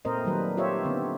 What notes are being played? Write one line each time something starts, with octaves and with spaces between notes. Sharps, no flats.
A#2 A3 C4 A#4 C5 D#5
D#3 F#3 G3 B4
F4 G4 C5 C#5 D#5 E5
D3 B3 C4